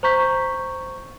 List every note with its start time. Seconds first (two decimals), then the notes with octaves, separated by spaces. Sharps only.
0.03 C5 A#5 C#6 G6 B6